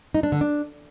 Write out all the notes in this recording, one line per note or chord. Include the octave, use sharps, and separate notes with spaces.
D#4
D4
D3
D4